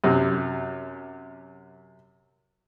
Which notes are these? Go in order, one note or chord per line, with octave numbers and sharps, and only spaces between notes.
F#2 C3